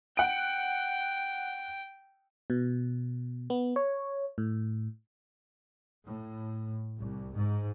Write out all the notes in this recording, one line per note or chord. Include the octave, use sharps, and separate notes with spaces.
F#5 G5 D7
B2
B3
C#5
A2
A2
C2
G#2